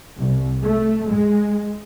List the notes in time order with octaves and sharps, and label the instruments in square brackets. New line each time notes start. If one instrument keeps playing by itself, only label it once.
[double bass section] C2
A3
G#3